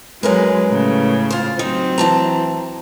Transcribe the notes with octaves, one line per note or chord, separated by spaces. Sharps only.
F#2 F#3 G#3 A#4 B4
A2 C#3
F4 C5
F#3 C4 D#4
E3 A5 A#5